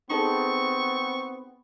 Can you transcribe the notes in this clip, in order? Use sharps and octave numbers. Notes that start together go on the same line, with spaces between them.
B3 C4 D#4 G#4 A4 C#6